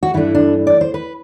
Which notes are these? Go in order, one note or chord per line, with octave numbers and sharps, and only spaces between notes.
F#4
G2 E3 A3 D4 E4
D4
D5
C5
B4